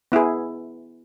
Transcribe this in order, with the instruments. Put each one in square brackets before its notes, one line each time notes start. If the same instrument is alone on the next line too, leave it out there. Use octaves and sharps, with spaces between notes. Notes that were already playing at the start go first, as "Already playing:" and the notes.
[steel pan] B3 E4 G#4